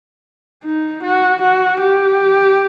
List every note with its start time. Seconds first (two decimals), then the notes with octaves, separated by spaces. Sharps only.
0.64 D#4
1.03 F#4
1.41 F#4
1.80 G4